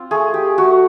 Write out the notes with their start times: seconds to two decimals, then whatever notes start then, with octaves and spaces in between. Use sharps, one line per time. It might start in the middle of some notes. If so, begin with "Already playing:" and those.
Already playing: C4 F4
0.11 A3 G#4
0.34 G4
0.58 A3 F#4